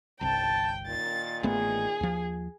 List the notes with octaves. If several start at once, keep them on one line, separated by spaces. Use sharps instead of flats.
G1 C2 G5 A5
A#2 D#3 A6
A1 A3 B3 G#4
D#2 F3